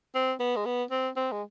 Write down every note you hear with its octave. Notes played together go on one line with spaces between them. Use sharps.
C4
B3
G#3
B3
C4
C4
G#3